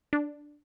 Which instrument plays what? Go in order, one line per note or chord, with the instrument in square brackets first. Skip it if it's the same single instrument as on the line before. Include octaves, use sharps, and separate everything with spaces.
[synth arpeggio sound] D4